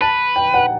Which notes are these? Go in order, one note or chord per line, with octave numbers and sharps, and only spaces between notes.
B4 A5
G5
F#5